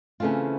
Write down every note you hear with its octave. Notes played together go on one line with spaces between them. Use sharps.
C#3 E3 A3 C4 F4